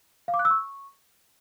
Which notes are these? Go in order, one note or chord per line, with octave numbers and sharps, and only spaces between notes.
F5
D6
F#6
E6
C#6